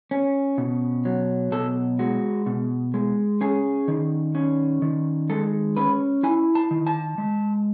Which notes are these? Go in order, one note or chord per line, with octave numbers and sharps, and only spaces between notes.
C#4
B2
F#3
B2 A4
G#3 F#4
B2
G#3
C#4 G#4
D#3
C#4
D#3
G#3 A4
C#4 B4
E4 G#5
A5
D#3
A5
G#3